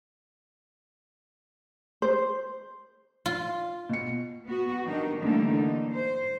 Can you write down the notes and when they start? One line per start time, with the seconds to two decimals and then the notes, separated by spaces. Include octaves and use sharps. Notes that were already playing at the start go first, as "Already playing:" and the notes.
2.02 C5
3.26 F4
3.89 B2 C#7
4.46 B3 F#4
4.85 D#3 G3 D4 D#4
5.21 D3 E3 G3 A3 A#3 D#4
5.51 D#4
5.92 C5